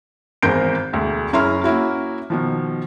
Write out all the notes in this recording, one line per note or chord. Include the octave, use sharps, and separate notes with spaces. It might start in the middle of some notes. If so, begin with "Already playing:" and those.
G#1 E2 A#4 C5 G6 D7
E1 D2
F#1 C#4 E4 A#5 C6 F6
A#3 C#4 E4 F#4
B2 D#3 F3